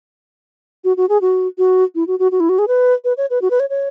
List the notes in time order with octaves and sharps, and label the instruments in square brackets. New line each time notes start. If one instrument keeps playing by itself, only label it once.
[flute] F#4
F#4
G#4
F#4
F#4
E4
F#4
F#4
F#4
E4
F#4
G#4
B4
B4
C#5
B4
F#4
B4
C#5
C#5